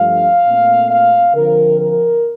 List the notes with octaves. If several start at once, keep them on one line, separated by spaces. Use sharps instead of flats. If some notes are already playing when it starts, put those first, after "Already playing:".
Already playing: G2 F3 A3 F5
A#2 A3 C4
F5
D3 F3 C4 A#4
A#4